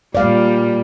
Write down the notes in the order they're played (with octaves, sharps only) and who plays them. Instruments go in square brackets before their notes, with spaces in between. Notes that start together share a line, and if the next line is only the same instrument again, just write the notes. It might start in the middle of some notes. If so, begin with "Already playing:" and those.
[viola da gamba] A#2 G3 [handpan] D5 F5